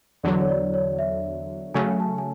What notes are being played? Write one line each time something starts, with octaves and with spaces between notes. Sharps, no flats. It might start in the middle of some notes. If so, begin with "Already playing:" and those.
E2 D3 F#3 D5
C#5
D5
C#5
E5
C#3 F#3 A3 C#4 G#5
A5
G#5